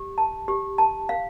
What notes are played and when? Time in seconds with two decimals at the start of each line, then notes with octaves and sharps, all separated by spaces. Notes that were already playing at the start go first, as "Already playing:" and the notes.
Already playing: G4
0.18 A5
0.48 G4
0.78 A5
1.09 F5